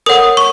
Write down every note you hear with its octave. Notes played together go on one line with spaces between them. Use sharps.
A#4 C#5 F#5 D#6
C#6